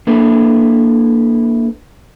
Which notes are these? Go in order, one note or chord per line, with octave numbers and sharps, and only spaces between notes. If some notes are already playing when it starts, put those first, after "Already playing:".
A#3 D4 E4 A4 B4